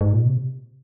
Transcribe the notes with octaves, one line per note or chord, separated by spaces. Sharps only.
G#2
A#2
C3